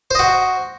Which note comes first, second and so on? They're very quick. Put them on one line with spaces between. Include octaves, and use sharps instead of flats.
C5 D#5 F#4